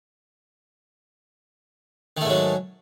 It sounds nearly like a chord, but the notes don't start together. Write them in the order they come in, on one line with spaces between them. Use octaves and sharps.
D#3 A3 G#2 F#3